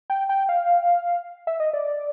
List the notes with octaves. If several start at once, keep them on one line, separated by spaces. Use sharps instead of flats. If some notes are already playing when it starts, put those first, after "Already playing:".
G5
G5
F5
E5
D#5
D5